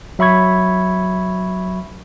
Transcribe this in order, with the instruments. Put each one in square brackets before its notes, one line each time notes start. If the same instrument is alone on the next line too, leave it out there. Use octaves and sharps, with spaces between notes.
[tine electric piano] F#3 E5 B5 C#6 G#6